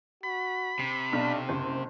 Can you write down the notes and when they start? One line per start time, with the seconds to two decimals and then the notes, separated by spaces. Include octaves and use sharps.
0.23 F#4 B5
0.79 C3 C7
1.13 B1 D4
1.49 F#1 C5